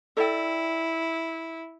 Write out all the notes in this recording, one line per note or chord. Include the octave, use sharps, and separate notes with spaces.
E4 A4 D5 G5